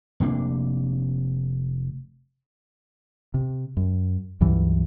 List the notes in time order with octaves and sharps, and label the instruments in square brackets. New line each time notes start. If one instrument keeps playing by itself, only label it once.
[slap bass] F1 C3 A#3 D4
[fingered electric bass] C3
F#2
C#2 G2 E3 F#3